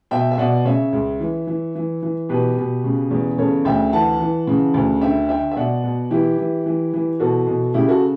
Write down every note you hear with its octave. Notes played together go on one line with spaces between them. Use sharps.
B2 E5 G5
E5
B2 D5 F#5
C#3 C#5 E5
C#2
E3
E3
E3
E3
B2 G4 B4
B2
C#3
E2
C#3 A4 C#5
D2 E5 G5
E3 F#5 A5
E3
C#3
D2
D3 E5 G5
D3 E5 G5
E5
B2 D5 F#5
B2
E3 E4 G4
E3
E3
E3
B2 F#4 A4
B2
C#3 E4 G4
F#4 A4